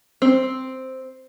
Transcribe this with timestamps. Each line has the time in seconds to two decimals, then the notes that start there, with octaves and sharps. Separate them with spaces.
0.22 C4